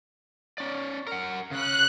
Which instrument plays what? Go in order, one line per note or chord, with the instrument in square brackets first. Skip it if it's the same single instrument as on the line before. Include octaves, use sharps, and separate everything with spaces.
[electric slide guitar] C#4 D5
A#4 F#5
[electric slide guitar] C#3 C#4 [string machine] F#6